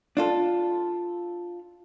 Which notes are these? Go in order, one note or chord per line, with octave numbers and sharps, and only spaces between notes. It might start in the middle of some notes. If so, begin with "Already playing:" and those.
D4 F4 A4